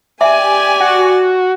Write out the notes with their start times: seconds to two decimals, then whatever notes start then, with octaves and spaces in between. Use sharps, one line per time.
0.21 G4 D5 E5 G#5
0.81 F#4